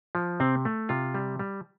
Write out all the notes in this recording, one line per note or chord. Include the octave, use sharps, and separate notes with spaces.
F3
C3 C4
A3
C3 F4
G3
G3